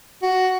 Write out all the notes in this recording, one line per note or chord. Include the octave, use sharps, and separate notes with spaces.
F#4